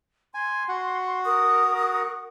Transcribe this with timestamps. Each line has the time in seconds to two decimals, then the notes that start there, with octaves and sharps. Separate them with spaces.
0.34 G#5 C6
0.69 F#4 F#5
1.25 A#4 D#6